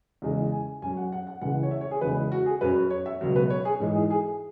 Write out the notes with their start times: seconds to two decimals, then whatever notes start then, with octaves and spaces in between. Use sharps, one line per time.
0.22 E2 C#3 E3 G#3
0.52 G#5
0.82 F#2 G#5
0.85 F#3
0.97 F#5
1.12 F#5
1.27 F#5
1.41 C#2 C#3 E3 G#3 F#5
1.63 C#5
1.71 E5
1.81 C#5
1.91 G#4
2.01 E2 C#3 E3 G#3 B4
2.32 F#4
2.46 G#4
2.61 F#2 F#3 B4
2.90 C#5
3.06 E5
3.21 C#2 B2 F#3
3.36 B4
3.50 C#5
3.65 G#4
3.80 G#2 E3 G#3
3.95 G#4
4.10 G#4